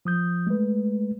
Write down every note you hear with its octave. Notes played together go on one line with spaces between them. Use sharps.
F3 D#6 G6
G#3 A3 B4